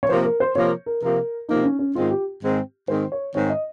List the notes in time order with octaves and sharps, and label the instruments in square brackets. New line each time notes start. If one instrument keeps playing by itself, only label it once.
[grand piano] C#5
[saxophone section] C3 F3 A#3 [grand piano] C5
[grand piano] A#4
C5
[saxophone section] C3 F3 A#3 [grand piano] C#5
[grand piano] A#4
[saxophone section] C3 F3 A#3 [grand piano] A#4
[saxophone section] C3 F3 A#3 [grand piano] D#4
[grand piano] C#4
C#4
[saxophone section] G#2 D#3 G#3 C4 [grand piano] F4
[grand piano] G4
[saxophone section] G#2 D#3 G#3 C4
[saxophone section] G#2 D#3 G#3 C4 [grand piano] C5
[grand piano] C#5
[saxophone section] G#2 D#3 G#3 C4 [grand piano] C#5
[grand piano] D#5